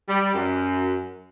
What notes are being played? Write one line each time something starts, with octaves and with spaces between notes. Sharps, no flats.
G3
F#2